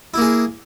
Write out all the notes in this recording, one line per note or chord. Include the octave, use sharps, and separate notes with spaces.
A#3 E4 G#4